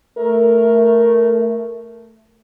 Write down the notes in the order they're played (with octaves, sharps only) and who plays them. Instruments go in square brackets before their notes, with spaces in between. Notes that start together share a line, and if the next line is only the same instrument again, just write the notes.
[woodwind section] A3 [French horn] A#4